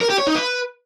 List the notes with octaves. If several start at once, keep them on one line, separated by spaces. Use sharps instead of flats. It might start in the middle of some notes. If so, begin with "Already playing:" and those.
A#4
G4
C#5
D#4
B4